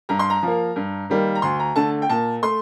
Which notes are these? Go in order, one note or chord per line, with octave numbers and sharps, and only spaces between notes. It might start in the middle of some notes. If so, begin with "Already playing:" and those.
G2 A#5
C6
A#5
F3 A#3
G2
D#3 G3 A#3
A#5
D2 C6
A#5
D3 A3 A5
G5
A#2 A5
A3 C6